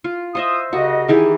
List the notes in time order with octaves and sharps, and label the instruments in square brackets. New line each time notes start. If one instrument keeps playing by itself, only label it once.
[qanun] F4
[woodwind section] F4 D#6 [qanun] C5 D#5 E5
[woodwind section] C2 C#3 D#5 [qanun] F#4
[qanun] D#3 E3 G4 [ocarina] G#4